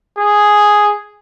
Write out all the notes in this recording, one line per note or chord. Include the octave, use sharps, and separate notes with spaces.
G#4